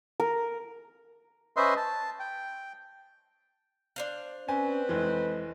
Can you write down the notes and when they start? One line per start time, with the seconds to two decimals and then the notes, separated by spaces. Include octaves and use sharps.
0.20 A#4
1.56 C#4 B4 C5 D#5 E5 C6
1.77 A5
2.19 G5
3.96 D4 C5 F5
4.48 C4 C#4 B4 G#5
4.89 F1 E3 G#3